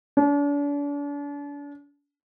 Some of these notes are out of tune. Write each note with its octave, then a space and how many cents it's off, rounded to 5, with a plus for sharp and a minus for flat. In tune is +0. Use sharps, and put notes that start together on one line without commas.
D4 -40